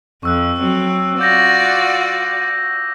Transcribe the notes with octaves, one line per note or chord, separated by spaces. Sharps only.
F2 C#6 E6 F#6
F#3 C4
F4 F#4 D5 D6 G6 A#6